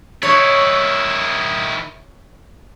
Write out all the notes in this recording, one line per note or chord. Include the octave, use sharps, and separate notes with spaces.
D#3 E4 C#5